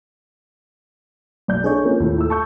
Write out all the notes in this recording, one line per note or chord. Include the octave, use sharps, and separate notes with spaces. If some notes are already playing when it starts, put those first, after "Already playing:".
B1 D5 G6
D4 D#4 G#4 A4 C#5
F3 A#3 C#4
D#2 A2 F3 A4
A3 E6
A5 C#6 G6